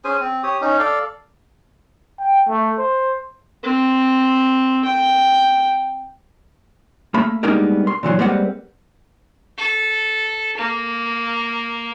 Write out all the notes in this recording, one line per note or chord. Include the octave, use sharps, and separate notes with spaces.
C#4 G#4 C5 G#5
C4
G4 C#5 D#6
C#4 D#4
A4 D5 F5
G5
A3
C5
C4
G5
A3 A#3 B5
G3 G#3 A#3 B3 D4 D#4
C6
A#2 E3 F#3 C6
G3 G#3 A#3 C4 B4 F#5
A4
A#3